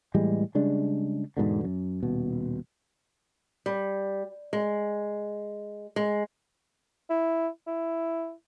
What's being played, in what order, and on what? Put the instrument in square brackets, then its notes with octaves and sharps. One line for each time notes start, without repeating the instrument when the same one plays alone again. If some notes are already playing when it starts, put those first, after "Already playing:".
[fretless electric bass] A2 E3 G3 G#3
C#3 G3 G#3 D4
E2 G#2 B2 D3
F#2
D#1 B2
[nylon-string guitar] G3
G#3
G#3
[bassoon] E4
E4